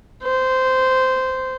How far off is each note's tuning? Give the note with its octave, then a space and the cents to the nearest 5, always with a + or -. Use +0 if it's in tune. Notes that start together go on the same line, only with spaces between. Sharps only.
C5 -15